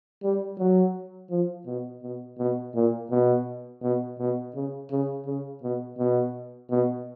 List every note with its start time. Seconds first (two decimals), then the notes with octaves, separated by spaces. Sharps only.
0.23 G3
0.59 F#3
1.30 F3
1.66 B2
2.03 B2
2.39 B2
2.75 A#2
3.11 B2
3.82 B2
4.19 B2
4.54 C#3
4.91 C#3
5.26 C#3
5.63 B2
5.98 B2
6.71 B2